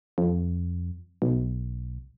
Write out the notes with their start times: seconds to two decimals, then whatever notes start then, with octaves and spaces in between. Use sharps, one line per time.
0.18 F2
1.22 B1